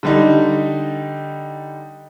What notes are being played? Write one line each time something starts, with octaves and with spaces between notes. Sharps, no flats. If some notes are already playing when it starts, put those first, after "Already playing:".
D3 G3 D#4